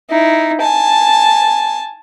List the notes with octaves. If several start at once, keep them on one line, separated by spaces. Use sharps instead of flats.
D#4 E4
G#5 A5